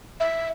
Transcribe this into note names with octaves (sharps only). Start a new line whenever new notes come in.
E5